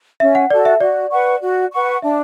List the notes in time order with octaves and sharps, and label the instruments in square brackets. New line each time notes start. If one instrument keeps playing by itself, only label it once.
[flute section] C#4 [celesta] E5
[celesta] F#5
[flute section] F#4 A4 [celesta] D5
[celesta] E5
[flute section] F#4 [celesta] D5
[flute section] B4 F#5 C#6
F#4
B4 F#5 C#6
[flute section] D4 [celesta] E5